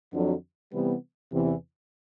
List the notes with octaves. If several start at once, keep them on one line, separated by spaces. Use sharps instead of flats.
F2 D3 F#3
C3 E3 G3 B3
E2 C3 E3